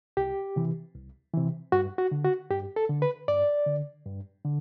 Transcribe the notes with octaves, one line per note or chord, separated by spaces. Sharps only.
C2 G4
C3 E3
C2
C3 E3
G2 F#4
F#4
D3
F#4
G2 G4
A4
D3
B4
G2 D5
D3
G2
D3